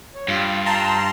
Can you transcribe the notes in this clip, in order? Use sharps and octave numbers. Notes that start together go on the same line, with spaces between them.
C#5
G2 F4
A5 A#5 C6